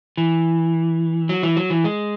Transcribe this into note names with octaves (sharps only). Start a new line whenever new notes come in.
E3
F#3
E3
F#3
E3
G#3